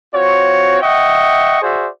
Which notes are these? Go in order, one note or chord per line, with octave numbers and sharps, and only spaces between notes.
C4 F4 F#4 C#5
D#5 E5 F#5 G5 C#6
F#4 G#4 C5 D5 E5